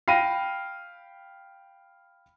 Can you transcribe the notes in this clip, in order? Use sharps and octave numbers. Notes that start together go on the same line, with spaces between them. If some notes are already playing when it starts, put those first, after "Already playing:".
F5 G5 B5 A#6 D#7